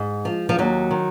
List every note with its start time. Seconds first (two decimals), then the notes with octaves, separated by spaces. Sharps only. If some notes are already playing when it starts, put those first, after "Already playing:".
Already playing: G#2 G#3
0.25 F3
0.49 F3
0.58 D#2 F#3
0.91 D#3